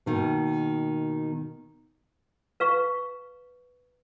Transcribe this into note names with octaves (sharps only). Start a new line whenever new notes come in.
B2 D#3 A#3
B4 F5 C#6